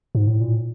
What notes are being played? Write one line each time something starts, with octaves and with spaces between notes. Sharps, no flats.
G#2
A2
A#2